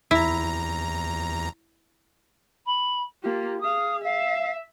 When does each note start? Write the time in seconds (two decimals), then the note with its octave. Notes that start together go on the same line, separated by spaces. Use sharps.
0.11 E2 E4 A#5
2.66 B5
3.23 A#3 F4 G4
3.61 G#4 F5 D#6
4.04 E5 F5